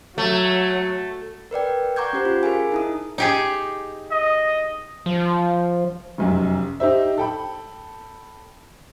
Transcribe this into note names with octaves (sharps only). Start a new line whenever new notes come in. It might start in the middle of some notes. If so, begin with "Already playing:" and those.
F#3 A3
A#4 B4 D5 G5
F#5 A#5 C#6 D6 G6 G#6
C#4 G4 C5
F4
G#4 A#4 F5 G#5
D#4 E4 D#6
D#4 G4 G#4
D#5
F3
F1 B1 F#2
D#4 G4 C5 E5
A4 G5 B5